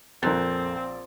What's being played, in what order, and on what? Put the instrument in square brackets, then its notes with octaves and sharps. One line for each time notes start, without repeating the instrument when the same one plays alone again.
[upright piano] A#1 A#4 A6 [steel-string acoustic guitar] F2 [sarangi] C4